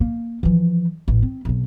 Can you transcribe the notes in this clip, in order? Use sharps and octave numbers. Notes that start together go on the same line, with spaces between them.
A#3
E3 F3
A1
C4
B1 C3